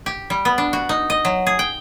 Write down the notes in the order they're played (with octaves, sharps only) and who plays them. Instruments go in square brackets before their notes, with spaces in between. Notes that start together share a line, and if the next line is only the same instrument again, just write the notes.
[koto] G4
G3
B3
D4
F#4
D#4
D#5
F#3
G#4
G5